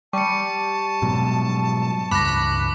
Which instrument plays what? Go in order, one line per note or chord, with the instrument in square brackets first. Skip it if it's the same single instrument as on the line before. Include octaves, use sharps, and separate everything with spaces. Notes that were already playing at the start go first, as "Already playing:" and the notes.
[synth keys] G3 [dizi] A5 [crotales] C#6 C#7
[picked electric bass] G#2 B2 F#3
[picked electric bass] C#2 G2 [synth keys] B5 F#6 [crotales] D6 A#6